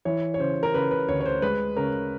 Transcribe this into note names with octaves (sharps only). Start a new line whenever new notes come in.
E3 C#5
C#5
C#3 C5
A#4
C#3 B4
B4
D2 C#5
C#5
C5
G#3 B4
C#3 A#4